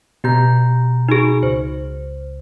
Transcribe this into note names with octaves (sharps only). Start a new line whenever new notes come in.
B2 G4 A#5 G6
D#4 F#4 G#4
C#2 C5